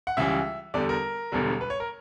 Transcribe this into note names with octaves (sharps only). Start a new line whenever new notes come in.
F#5
C#2 C#3 E3 G3 E5
E2 D3 G3 D5
A#4
E1 E2 D3 G3
B4
C#5
A#4